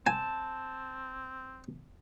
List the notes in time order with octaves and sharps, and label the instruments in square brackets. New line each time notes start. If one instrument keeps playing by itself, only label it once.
[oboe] C4 [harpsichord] G#5 [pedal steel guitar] A5